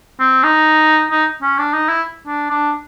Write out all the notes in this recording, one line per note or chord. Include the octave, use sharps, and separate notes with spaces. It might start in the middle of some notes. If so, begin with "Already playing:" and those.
C4
D#4
D#4
C#4
D4
D#4
E4
D4
D4